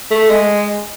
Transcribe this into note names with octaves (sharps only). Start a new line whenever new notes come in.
A3
G#3